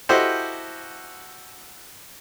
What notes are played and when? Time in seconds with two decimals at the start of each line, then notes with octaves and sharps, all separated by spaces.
0.09 E4 F#4 G4 A4 C5 D#5